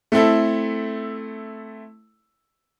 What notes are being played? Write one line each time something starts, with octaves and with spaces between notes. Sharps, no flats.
A3 C4 E4 A4